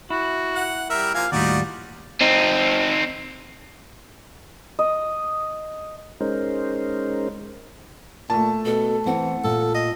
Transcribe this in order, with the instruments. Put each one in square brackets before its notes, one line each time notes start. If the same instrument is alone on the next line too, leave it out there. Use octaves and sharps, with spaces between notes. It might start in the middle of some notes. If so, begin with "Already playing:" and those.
[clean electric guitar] E4 [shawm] F#4
[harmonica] F#5
[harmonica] G3 E5 [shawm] A#4
[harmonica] F3 A#3 G#5 [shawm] F5
[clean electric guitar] D#2 A2 G3 [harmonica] D#4 F4 F#4 [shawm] D5
[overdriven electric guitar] C4 D#4
[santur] D#5
[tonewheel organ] G#3 C#4 D#4 A#4 C5
[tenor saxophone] A#2 [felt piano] A3 A5
[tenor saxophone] B2 [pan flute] A4
[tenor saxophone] E3 [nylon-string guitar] C4 [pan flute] F#5
[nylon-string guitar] A#2 [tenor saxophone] A4
[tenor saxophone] D#5